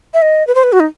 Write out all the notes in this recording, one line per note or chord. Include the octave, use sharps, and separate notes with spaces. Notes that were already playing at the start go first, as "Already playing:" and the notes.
E5
D#5
B4
C5
B4
F#4
D#4